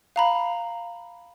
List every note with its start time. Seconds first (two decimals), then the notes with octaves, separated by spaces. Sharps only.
0.16 F5 A#5 B5